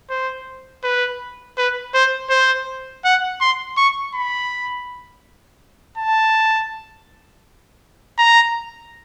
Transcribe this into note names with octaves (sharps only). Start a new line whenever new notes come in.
C5
B4
B4
C5
C5
F#5
C6
C#6
B5
A5
A#5